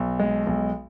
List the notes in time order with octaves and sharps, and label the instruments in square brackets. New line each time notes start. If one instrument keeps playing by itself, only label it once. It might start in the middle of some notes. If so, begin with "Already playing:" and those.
Already playing: [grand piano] B1
G#3
B1